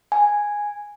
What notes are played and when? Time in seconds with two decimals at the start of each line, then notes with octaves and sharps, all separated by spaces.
0.12 G#5